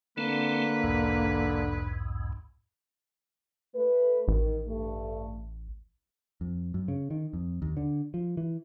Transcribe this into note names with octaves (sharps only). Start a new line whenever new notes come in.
D3 A3 A#3 C4 B4
B1 E2 G#2
A3 B4
A1 D#3
G2 A3
F2
F#2
C#3
D#3
F2
D#2
D3
F3
E3